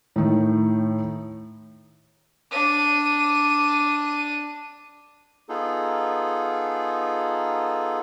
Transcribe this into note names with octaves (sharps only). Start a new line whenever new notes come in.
A2 D#3
D4 D#7
B3 D#4 F4 G#4 A4